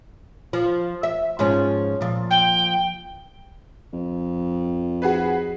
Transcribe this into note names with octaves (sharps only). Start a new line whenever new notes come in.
F3
E5
G#2 F3 C#4
A#2 F3
G5
F2
F#4 G#4 B4